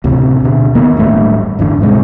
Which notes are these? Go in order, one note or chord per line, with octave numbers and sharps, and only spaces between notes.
A1 D2 C3
B2 D3
E2 D#3 A#3 B3
D1 A1 G2 A3
G1 E2 G2 D3
A2 C3 G#3